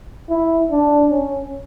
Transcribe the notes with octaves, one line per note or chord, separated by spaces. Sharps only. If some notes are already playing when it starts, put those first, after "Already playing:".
E4
D4
C#4